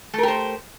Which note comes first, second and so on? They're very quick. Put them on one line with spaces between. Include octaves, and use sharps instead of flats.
A3 A#4 G4 C5